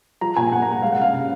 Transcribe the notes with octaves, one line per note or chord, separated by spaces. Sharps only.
F3 A#5
A#2 G#5
A#2 F#5
A#5
A#3 F#5
G#3 F5
F#5
C#3 F5
C#3